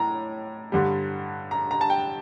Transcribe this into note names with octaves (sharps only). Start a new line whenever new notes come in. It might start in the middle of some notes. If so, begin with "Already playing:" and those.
Already playing: A2 A#5
G2 D3 G3
A#5
A#5
A5
G5